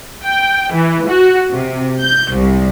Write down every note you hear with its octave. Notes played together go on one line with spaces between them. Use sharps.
G5
E3
F#4
C3
G6
C2